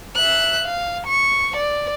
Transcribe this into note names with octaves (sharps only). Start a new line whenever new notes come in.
E5 F#6
F5
C#6
D5